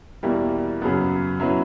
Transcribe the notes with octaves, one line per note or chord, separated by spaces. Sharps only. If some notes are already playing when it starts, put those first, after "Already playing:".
E2 B2 G3 A#3 E4
F#2 C#3 F#3 B3
B2 F#3 C#4 E4 B4